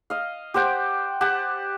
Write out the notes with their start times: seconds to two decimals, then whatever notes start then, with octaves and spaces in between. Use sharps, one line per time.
0.10 D#5 F5
0.54 G4 C5 F#5 G5
1.21 G4 F#5 A5